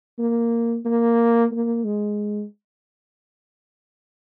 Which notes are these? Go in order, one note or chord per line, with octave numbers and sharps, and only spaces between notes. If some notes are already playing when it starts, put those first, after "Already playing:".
A#3
A#3
A#3
G#3